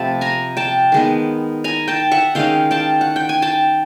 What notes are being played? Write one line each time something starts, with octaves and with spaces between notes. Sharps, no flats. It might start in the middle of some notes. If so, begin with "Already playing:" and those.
Already playing: C3 F3 A3 A5 B5
G#5 A#5
G5 A5
D#3 G#3 B3
G#5 A#5
G5 A5
E5 F#5
D#3 G#3 C#4 F5 G5
G5 A5
F#5
G5
G#5
G5 A5